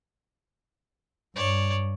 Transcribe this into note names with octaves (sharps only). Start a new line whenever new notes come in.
G2 C#5 D5